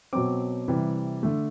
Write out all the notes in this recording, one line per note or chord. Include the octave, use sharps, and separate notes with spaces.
B2 F#3 C4 D6
C3 E3 G3
D3 A3